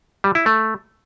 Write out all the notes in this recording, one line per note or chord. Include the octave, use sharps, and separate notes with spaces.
G3
E4
A3